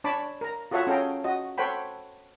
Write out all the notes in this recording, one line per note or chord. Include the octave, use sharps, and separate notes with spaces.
D4 C#5 A5 B5 D6
A#4 A#5
F4 F#4 A4 C#5 E5 F#5
C#4 G#4 A4 F5 G5 A#5
F#4 D#5
A4 C5 C#5 F#5 G5 B5